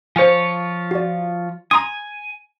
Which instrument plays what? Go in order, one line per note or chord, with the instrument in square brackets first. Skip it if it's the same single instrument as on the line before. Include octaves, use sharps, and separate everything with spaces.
[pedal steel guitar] F3 F4 C#5 [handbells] C5 G#5
[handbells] F#4 D5
[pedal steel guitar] G#5 [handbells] A#5 C6 D#6